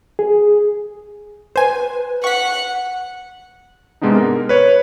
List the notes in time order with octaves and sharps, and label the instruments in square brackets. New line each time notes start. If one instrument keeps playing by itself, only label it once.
[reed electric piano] G#4
[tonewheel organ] B4 [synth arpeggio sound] C5 G#5
[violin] F#5 [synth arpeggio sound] C#6 B6
[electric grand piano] G#2 C3 G#3 B3 D4 D#4
A#4
B4 C#5